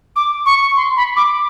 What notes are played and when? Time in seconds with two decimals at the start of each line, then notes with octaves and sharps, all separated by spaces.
0.16 D6
0.46 C#6
0.77 C6
0.97 B5
1.16 D6